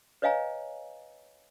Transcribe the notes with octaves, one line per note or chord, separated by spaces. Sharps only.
B4 C#5 D#5 F5 G#5 A#5